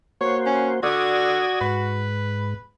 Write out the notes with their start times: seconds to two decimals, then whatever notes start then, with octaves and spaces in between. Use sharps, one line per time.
0.21 A#3 F#4 C5 C#5
0.46 C#4
0.83 D3 F#4 D5 D#6 G#6
1.61 G#2 B4